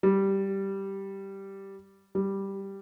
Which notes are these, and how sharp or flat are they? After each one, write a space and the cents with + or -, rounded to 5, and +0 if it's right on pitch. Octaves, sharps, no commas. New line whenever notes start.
G3 -5
G3 +0